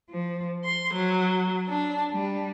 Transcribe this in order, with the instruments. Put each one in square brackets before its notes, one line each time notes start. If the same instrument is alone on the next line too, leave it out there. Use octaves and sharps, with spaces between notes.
[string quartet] F3
C6
F#3
D4
G3